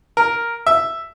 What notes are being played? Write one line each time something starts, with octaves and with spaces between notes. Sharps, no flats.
A#4
E5